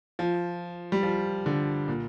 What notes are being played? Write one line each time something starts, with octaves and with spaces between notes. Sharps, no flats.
F3
G3
F3
D3
A#2